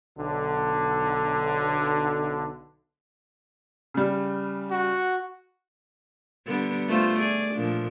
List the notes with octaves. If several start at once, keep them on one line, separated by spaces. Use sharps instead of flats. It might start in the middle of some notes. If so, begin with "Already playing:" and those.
B1 D3
C#3 G3
F#4
D3 G3 B3
A3 F4 C5
G#4 D5
A#2 F3 D4